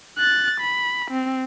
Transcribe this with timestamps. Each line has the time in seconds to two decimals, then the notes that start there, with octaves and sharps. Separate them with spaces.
0.18 F#6 A6
0.60 B5
1.11 C4